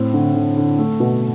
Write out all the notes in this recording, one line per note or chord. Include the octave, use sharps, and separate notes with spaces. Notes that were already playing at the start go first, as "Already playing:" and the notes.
Already playing: A2 C4
D3
D3
D3
A3
B2